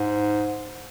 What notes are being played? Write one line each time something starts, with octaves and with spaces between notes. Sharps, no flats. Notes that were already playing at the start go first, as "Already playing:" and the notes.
Already playing: G#2